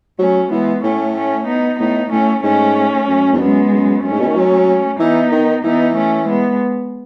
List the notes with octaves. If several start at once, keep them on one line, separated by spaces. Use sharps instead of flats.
F#3 A3 C#4
E3 G#3 B3
A2 A3 C#4
A3 C#4
B3 D#4
A2 B3 D#4
A2 A3 C#4
G#2 A3 C#4
F#2
E2
F#2 G#3 B3
F#2
F#2 A3 C#4
G#2
B2
D#3
F#3
E3 B3 D#4
D#3
E3 B3 D#4
A3 C#4
G#3 B3